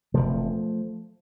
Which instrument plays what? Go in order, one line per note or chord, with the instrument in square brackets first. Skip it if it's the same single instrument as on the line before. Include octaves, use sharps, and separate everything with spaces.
[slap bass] E1 D2 C3 F3 A3